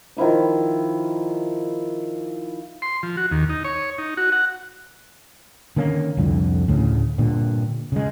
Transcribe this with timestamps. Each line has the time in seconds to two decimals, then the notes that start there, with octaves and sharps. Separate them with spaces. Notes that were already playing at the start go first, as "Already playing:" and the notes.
0.17 D#3 F3 E4 D6
2.82 C6
3.03 F3
3.17 F#4
3.31 D#2
3.49 D#4
3.65 C#5
3.98 D#4
4.17 F#4
4.32 F#5
5.76 D3 D#3 A#3 C#4
6.17 C2 F2 D3
6.68 D2 A2 C#3
7.18 G2 A#2 D3
7.92 C#3 G#3